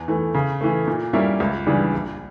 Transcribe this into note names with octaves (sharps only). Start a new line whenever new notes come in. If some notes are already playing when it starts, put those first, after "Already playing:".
Already playing: E2
E3 A3
C#3
E3 A3
A#2
G3 A#3 C#4 E4
C#2
C#3 E3 G3 D4
A#1